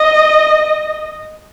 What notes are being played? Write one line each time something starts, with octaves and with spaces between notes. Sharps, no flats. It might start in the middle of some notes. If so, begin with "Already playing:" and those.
Already playing: D#5